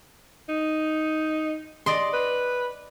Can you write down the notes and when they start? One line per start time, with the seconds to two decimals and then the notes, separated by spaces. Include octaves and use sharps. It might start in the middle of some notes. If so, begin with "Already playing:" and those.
0.49 D#4
1.86 D5 D#5 C6
2.13 B4